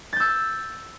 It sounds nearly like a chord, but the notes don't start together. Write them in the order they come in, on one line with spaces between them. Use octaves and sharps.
A6 G6 E6